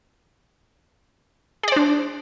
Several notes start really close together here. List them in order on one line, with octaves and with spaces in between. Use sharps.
G#4 D5 C5 D4